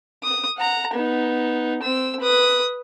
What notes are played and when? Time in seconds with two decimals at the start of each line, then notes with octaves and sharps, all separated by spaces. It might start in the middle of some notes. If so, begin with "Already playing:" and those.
0.23 D#6
0.57 F#5 A#5
0.93 B3 D#4
1.82 C4 E6
2.21 B4 D#6